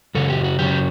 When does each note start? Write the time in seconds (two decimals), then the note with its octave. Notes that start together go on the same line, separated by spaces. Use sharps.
0.15 F#2 C#3 F#3 A4
0.30 G4
0.44 F#4
0.59 F#2 C#3 F#3 G4